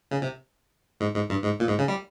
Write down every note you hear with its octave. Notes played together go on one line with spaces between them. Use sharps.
C#3
C3
G#2
G#2
G2
G#2
A#2
G#2
C#3
G3